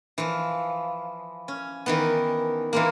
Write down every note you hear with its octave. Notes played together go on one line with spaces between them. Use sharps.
E3 F3
C#4
D#3 E3 B3
E3 G#3 A#3